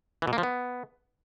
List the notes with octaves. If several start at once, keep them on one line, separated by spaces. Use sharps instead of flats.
E3
B2
A#3
F3
B3